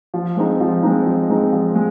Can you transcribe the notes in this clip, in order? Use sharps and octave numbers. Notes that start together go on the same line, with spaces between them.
F3
G#3 C4 D#4
F3
G#3 C4 D#4
F3
G#3 C4 D#4
F3
G#3